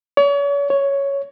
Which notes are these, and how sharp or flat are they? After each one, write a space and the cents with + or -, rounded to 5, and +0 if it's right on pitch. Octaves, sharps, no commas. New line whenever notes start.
C#5 +40
C#5 +5